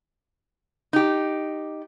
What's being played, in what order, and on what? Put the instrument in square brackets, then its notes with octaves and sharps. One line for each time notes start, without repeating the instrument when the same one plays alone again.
[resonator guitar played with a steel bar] D#4 G4